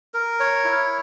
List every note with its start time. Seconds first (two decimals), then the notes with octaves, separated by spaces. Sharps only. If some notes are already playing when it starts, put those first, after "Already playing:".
0.14 A#4
0.40 C#5
0.65 E4